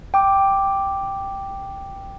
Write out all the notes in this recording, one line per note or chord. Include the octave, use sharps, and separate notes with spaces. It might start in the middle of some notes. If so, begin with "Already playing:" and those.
G5 D6